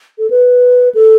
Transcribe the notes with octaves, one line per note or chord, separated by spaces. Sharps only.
A4
B4
A4